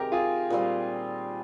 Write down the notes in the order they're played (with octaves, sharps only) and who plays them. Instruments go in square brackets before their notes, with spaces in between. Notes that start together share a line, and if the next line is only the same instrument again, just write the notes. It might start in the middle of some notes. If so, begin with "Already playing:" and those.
Already playing: [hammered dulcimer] C3 D#3 G#3 [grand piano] G4 A#4
[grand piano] F4 G#4
[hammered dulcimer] A#2 G3 C4